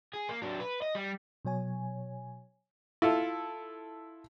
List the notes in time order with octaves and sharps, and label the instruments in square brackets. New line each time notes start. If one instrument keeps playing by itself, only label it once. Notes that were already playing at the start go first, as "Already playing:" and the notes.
[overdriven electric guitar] G#4
A#3
F#3 D4
B4
D#5
G3
[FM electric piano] B2 F#3 C#5 G#5
[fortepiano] E4 F4 A4